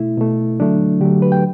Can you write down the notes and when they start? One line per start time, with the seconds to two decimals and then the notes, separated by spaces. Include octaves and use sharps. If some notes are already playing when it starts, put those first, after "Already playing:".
Already playing: B2 A3 E4
0.17 B2 A3
0.60 D3 F#3 A3 D4
1.01 D3 F#3 A3 G4
1.22 B4
1.32 G5